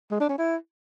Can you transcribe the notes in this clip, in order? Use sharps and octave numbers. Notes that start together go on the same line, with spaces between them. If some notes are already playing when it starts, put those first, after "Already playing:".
G#3
D4
C#4
E4